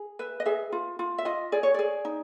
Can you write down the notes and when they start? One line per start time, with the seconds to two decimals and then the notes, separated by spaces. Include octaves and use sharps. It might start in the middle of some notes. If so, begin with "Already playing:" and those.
Already playing: G#4
0.19 B4 E5
0.40 D#5
0.46 G#4 E5
0.72 F4
0.99 F4
1.18 E5
1.25 F4 D#5
1.52 G#4 D5
1.63 C#5
1.74 G#4 D5
2.05 D#4